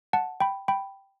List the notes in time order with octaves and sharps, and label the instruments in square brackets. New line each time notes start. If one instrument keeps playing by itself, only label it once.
[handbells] F#5 A5
G5 B5
G5 B5